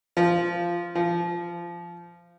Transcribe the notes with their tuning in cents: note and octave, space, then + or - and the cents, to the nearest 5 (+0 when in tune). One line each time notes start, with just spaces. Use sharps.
F3 -5
F3 -15